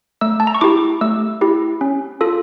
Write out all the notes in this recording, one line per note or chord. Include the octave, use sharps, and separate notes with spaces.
A3 E6
A5
A#5
C#6
E4 G4 D6
A3 E6
E4 G4
C#4
F4 A4